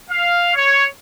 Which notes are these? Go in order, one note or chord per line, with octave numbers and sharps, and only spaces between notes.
F5
C#5